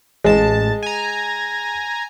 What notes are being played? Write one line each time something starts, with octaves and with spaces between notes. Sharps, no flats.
A1 G#3 A5
G#5 A#5